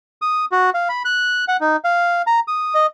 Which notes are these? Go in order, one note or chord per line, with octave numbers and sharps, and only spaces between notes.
D#6
F#4
F5
B5
F#6
F#5
D#4
F5
A#5
D#6
D#5